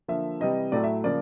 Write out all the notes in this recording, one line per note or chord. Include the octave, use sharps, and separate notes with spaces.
D3 F3 A#3 E5
C3 E3 G3 D#5
A2 F#3 A3 D5
E5
C#3 F3 A#3 D5